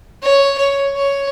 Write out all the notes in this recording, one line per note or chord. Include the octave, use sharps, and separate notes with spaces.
C#5
C#5
C#5